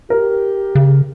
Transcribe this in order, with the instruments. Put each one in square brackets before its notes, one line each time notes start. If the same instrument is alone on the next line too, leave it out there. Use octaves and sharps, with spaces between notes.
[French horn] G4 [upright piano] A#4
[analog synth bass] C#3